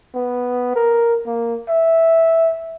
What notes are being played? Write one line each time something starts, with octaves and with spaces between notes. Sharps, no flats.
B3
A#4
A#3
E5